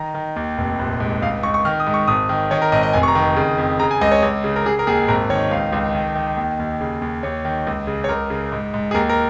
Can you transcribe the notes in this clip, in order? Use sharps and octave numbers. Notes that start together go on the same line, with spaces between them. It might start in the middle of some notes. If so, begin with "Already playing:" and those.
Already playing: D#3 A#5
D#3
D#2
F1
A#1
G#2
C#2 F5
C#2 C#6
C#6
D#3 F6
D#6
G#2
C#6
G#1 D#6
D#3
D#3 C#5
A#4
G#1 D#5
D#5
F1 G#5
C#6
A#5
D#3
C#3
F2
C#3 A#5
G#5
C#2 D#5
C#5
C#2
C#3
A#4
C#3 G#4
A#4
D#2 G#4
G#1 A#4
D#3 C#5
C#2 F5
C#2
D#3
D#3
D#2
D#2
C#3
D#2
D#2 C#5
D#3
C#2
C#3
C#5
C#2 A#4
C#3
G#2
G#2
G#4
D#2 A#4
A#4